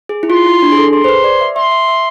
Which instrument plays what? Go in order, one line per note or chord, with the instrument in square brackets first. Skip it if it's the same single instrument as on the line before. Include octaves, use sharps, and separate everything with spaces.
[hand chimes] G#4
E4
[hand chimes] F4 [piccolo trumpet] C6
[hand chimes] E4
D4
G#4
A4
[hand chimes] G#4 [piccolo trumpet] C6
[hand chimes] C5
B4
D5
E5
[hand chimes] E5 [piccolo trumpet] C6
[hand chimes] E5
E5